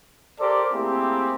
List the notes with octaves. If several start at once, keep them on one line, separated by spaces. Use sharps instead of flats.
G4 A4 A#4 C5 D5
A3 A#3 C4 E4 G4 G#4